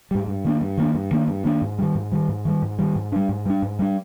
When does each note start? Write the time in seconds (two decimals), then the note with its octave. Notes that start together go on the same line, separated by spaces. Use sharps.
0.11 G#2 G3
0.27 G2
0.45 D#3 A#3 D4
0.61 G2
0.78 D#3 A#3 D4
0.95 G2
1.11 D#3 A#3 D4
1.28 G2
1.45 D#3 A#3 D4
1.62 G#2
1.79 D#3 G3
1.95 G#2
2.12 D#3 G3
2.29 G#2
2.45 D#3 G3
2.63 G#2
2.79 D#3 G3
2.95 G#2
3.12 G3 D4
3.29 G#2
3.46 G3 D4
3.62 G#2
3.79 G3 D4